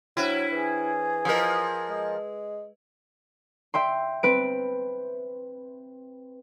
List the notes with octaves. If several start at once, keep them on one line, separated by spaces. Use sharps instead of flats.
F#3 D4 E4 C5 C#5
E3 G#4
F3 A#4 B4 D#5
G#3
E5 G5 C6
C4 B4 D7